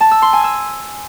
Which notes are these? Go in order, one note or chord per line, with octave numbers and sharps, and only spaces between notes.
A5
E6
C6
G#5
E6